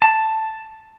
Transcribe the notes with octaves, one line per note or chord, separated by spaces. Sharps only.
A5